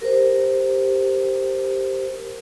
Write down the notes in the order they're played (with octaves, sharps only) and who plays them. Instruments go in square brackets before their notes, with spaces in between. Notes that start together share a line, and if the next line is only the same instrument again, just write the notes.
[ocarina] G4 [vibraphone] A#4 C5